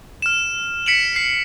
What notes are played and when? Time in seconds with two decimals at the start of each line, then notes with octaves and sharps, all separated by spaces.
0.22 F6 E7
0.86 B6 C#7 D7 E7 F#7
1.16 C7